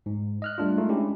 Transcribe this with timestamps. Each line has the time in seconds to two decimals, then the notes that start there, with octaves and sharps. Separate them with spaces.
0.06 G#2
0.42 D#5 F6 F#6
0.58 G3 A3 D4 F4
0.77 G#3 A3 D#4 F4
0.89 G#3 C#4 D4 E4 G4